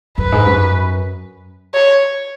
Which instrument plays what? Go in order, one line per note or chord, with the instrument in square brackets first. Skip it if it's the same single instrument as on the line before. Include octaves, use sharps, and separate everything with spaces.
[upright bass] F#2 [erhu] B4
[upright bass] G#2
F#2
[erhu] C#5